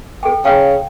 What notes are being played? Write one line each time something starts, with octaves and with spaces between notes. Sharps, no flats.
A4 G5
C#3 F5 G5